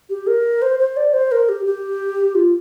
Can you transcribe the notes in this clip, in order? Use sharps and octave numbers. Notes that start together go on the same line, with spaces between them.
G4
A#4
C5
C5
D5
C5
A#4
G4
G4
F4